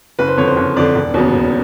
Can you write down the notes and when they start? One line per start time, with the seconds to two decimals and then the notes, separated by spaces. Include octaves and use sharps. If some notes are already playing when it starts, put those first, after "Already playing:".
0.19 F#1 B4
0.27 C5
0.37 F2 D3 C#5
0.48 C5
0.56 F#1 C#5
0.76 F2 D3 D5
0.95 E1
1.14 D#2 C#3 F#3 B3
1.33 E1